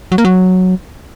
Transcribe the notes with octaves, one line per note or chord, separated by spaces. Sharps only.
F#3
A#3
F#3